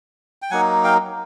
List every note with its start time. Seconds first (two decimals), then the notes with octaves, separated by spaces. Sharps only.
0.42 G5
0.51 F#3 A#3 D#4 F#5 G#5
0.84 F5 G5